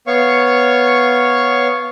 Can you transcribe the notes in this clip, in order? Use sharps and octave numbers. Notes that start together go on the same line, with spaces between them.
B3 C#5 F5 C#6